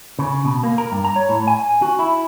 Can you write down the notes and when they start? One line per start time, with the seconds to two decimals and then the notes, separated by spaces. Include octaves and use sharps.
0.19 C#3
0.45 B2
0.63 A#3
0.78 A#4
0.92 G2
1.04 A#5
1.16 C#5
1.29 A2
1.47 G#5
1.82 F#4
1.99 E4